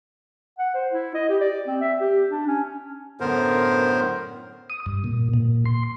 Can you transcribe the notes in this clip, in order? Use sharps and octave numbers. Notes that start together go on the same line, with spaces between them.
F#5
C5
E4
D#5
G4
D5
C4
E5
G4
D4
C#4
F#2 A2 D3 B3 A#4 C5
D#6
G2
A#2
A#2
C6